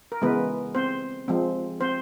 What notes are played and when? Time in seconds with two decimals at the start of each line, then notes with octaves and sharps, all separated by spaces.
0.12 A#4
0.22 C#3 E3 G#3 B3 B4
0.75 C4 C5
1.28 F3 G#3 C4
1.81 C4 C5